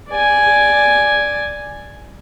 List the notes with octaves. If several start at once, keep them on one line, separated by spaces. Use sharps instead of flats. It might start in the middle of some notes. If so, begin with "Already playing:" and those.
D5 G#5